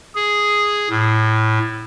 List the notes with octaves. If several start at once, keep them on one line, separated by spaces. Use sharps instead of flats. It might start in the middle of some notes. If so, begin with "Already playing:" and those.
G#4
A2